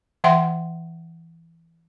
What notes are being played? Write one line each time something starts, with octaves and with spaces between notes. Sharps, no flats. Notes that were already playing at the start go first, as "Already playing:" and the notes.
E3 E5 F#5 G5 C6